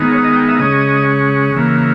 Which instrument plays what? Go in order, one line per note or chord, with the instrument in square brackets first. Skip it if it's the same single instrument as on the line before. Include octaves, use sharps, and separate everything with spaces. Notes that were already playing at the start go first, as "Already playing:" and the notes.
Already playing: [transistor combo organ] D#3 G#3 B3 D#4
C#5
D#5
G5
E5
C#3 G#3 C#4 D#5
C#3 E3 A#3